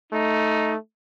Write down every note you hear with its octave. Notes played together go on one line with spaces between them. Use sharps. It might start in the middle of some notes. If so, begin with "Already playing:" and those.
A3 D#4